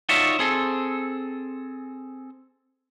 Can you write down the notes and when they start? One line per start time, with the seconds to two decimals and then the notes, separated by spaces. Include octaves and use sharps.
0.09 D#4 F4 F#4 C#5 D5 E5
0.39 C4 G#4 A4